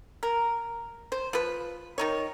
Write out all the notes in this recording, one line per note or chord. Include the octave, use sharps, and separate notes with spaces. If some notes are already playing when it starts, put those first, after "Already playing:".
A#4
C5
F3 B4
D#3 D#4 C#5